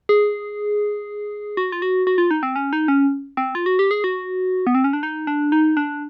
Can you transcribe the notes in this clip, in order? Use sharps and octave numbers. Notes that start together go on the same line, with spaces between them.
G#4
F#4
F4
F#4
F#4
F4
D#4
C4
C#4
D#4
C#4
C4
F4
F#4
G4
G#4
F#4
B3
C4
C#4
D4
D#4
D4
D#4
D4